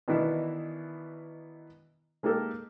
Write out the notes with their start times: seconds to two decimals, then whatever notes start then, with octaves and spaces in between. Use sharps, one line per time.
0.08 B2 D#3 E3 B3 D4 E4
2.23 G#3 A#3 D#4 G4 A4 A#4